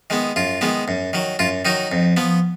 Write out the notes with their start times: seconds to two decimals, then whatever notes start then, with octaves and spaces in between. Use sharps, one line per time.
0.10 D#3 G#3 B3
0.36 F#2 F4
0.61 D#3 G#3 B3
0.88 F#2
1.13 D#3 F#3
1.39 F#2 F4
1.65 D#3 F#3 D#4
1.92 F2
2.17 F3 B3